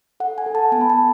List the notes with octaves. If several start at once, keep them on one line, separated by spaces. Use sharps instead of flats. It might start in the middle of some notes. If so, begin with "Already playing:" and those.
A4 F#5
G#5
A4
A5
B3 G#5
B5
A5
B3